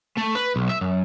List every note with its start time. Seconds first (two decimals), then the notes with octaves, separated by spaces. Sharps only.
0.17 A3
0.35 B4
0.56 B1
0.69 E5
0.81 F#2